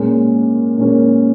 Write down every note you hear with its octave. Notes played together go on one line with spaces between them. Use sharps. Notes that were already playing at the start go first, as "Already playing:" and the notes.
Already playing: A#2 G#3 C#4 A#4
A#2 G#3 C#4 A#4